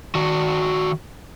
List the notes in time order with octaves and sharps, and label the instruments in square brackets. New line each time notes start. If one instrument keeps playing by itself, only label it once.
[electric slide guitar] D#3 F#4